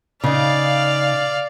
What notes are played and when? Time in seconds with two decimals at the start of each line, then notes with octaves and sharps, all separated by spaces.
0.24 C#3 D#4 D5 F5